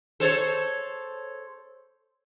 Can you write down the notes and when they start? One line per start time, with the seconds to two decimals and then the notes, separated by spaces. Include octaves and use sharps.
0.20 A4 C5 C#5